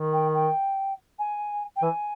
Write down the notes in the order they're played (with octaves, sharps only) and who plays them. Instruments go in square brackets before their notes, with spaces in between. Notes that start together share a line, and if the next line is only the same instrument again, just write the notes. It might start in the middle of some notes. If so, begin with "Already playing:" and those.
Already playing: [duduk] D#3
[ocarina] G5
G5
G#5
G5
[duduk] E3 [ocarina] G#5